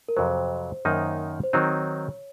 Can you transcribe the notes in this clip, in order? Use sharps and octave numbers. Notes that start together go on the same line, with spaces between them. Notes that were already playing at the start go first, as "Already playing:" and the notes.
A#4
F2 C3 F#3 C5
F#2 D#3 A#3 D#4
C5
D#3 F#3 C4 D#4 C#5